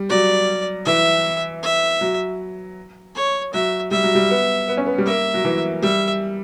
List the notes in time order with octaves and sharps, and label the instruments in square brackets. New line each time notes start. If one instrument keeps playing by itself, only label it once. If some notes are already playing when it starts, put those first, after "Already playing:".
Already playing: [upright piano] G3
[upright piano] F#3 [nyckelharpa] D5
[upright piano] E3 [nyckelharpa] E5
[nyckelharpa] E5
[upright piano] F#3
[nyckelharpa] C#5
[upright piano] F#3 [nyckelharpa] E5
[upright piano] G3 [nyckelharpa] E5
[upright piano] F#3
G3
B3
B3
C#4
B3
G3
[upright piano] A#3 [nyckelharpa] E5
[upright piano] F#3
E3
[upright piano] G3 [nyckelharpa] E5